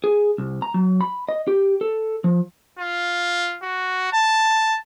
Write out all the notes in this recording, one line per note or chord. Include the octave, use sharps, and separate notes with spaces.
G#4
C2
A#5
F#3
B5
D#5
G4
A4
F3
F4
F#4
A5